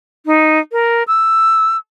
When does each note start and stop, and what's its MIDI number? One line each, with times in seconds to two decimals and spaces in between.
0.26 0.59 63
0.72 1.03 70
1.07 1.77 88